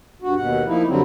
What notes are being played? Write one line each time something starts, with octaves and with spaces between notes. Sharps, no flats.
G2 F#4
D#2 B2 F#5
F3 A#3 D#4 E4
F#2 D3 F#3 G3 C4